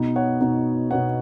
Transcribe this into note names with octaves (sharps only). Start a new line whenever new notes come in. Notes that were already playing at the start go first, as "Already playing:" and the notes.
Already playing: B2 B3 D#4
C#5 F#5
B2 B3 D#4
B2 B3 D#4 C#5 F#5